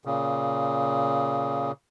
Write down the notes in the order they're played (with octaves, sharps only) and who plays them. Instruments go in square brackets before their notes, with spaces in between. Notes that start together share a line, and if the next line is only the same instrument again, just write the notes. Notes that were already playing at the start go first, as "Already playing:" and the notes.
[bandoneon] A#2 C#3